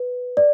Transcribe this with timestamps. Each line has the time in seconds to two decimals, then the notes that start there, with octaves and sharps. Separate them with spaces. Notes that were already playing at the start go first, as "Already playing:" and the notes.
Already playing: B4
0.37 D5